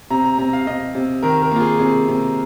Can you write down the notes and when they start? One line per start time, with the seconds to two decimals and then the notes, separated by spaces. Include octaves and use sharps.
0.10 C3 A#5
0.24 A#5
0.38 C3 A#5
0.53 F5
0.67 C3 D#5
0.95 C3
1.23 D#3 A#4
1.42 A#4
1.51 A#3 F4
1.60 G#4
1.79 C3 G#4
2.08 C3